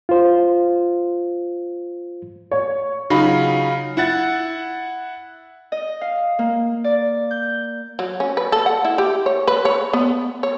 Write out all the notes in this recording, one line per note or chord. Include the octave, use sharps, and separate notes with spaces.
F4 C5
C#5
C#3 F#3 D#4 F4 B5
E4 F#5 A6
D#5
F5
A#3
D5
G6
F#3
C#4
B4
A4
F#5
E4
G4
C#5
B4
C#5
B3
C#5